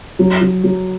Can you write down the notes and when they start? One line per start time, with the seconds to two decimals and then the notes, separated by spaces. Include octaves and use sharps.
0.19 F#3
0.41 F#3
0.64 F#3